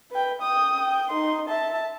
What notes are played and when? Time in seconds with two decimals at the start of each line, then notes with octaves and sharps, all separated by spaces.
0.11 B4 G5
0.41 G5 D#6
0.80 G5
1.10 D#4 C6
1.48 E5 A5